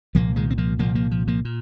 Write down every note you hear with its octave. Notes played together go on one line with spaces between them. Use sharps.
C2 A#2 F3 A#3
D#3 G#3
C4
F3 A#3
C2 A#2 F3 A#3
F3 A#3
F3
F3 A#3
A#2